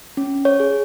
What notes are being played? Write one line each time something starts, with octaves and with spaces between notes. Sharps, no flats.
C#4
C#5
G#4